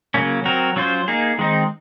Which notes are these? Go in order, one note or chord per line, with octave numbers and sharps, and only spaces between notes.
C#3 F#3 A#3 C#4
F#3 C4 F#4 A#4
F#3 C#4 F4 C5
A#3 D#4 G#4
D#3 G#3 C4 D#4